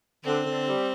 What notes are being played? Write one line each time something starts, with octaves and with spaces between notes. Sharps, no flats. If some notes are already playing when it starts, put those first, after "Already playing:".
D3 C4
D3
G3